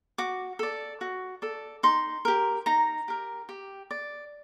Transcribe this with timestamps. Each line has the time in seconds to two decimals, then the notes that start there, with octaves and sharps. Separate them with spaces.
0.18 F#4 D6
0.59 A4 D5
1.01 F#4
1.42 A4 D5
1.83 D#4 C6
2.25 G4 A#4
2.66 D#4 A#5
3.08 G4 A#4
3.49 G4
3.91 D5